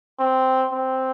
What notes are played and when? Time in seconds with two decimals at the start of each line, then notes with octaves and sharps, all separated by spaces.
0.19 C4
0.73 C4